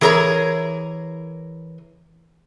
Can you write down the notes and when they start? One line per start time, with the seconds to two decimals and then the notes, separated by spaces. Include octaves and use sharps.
0.01 E3 G#4 A#4 C#5 A#5